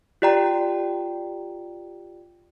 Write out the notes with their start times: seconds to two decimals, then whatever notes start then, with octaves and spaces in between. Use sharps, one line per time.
0.22 F4 G4 D5 G5 A#5